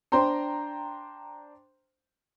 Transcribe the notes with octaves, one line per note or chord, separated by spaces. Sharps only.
D4 C5 G5 A#5 C6